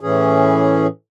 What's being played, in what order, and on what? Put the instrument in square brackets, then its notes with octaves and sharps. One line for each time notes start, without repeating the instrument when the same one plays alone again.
[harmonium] A2 E3 C#4 G#4